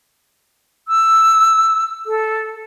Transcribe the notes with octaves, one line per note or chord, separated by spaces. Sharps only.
E6
A4